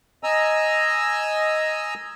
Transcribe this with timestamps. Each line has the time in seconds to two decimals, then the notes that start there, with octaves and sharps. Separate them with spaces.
0.23 D#5 G#5 A#5 E6